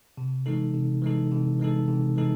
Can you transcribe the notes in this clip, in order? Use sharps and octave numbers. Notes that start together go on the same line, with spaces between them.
C3
E3 G#3 D#4 A4
C3
E3 G#3 D#4 A4
C3
E3 G#3 D#4 A4
C3
E3 G#3 D#4 A4